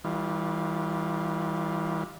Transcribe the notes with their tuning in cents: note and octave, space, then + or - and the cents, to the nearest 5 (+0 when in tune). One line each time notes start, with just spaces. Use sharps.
E3 -35 G3 +0 F4 +0